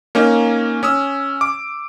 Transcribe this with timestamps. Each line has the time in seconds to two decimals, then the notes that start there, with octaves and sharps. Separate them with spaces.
0.15 A#3 C#4 D#4
0.83 C#4 D#6 E6
1.41 D6